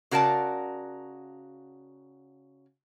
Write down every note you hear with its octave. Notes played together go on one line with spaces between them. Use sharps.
C#3 F#4 A#4 D5 A5